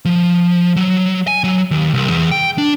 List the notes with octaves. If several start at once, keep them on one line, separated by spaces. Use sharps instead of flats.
F3
F#3
G#5
F#3
D#2
C2
E2
G5
D4